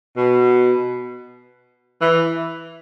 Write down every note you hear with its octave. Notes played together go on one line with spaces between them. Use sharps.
B2
E3